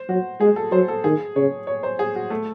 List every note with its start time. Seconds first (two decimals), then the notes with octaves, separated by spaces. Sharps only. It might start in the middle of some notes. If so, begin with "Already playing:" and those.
Already playing: C5
0.09 F#3 F#4
0.40 G#3 G#4
0.56 A4
0.72 F#3 C5
0.88 A4
1.04 D#3 G#4
1.36 C#3 C#5
1.67 C#5
1.83 C5
1.99 G#4
2.15 F#4
2.30 A3